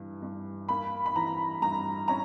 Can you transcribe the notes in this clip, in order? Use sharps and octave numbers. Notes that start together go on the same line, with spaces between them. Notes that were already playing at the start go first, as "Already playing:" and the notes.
Already playing: G2 E3
G2
A#3 B5
B5
E3 A#5
G2 A#5
C#4 A#5